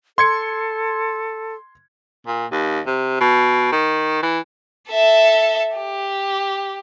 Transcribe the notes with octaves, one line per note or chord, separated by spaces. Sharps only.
A4 C6 G#6 C#7
A#2
D#2
C3
B2
D#3
E3
A4 E5
G4